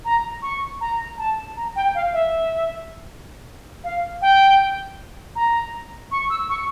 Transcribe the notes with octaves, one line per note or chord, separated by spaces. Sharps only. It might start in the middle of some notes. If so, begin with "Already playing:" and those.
A#5
C#6
A#5
A5
A#5
G5
F5
E5
F5
G5
A#5
C#6
E6
C#6